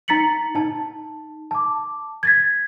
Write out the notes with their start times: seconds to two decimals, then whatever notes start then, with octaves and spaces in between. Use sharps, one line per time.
0.08 D#4 A#5 A6 B6 C#7 F#7
0.55 D#4 A5
1.51 A5 D6
2.23 G#6 A6 B6